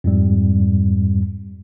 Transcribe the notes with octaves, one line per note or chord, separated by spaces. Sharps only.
F2 G#2 G3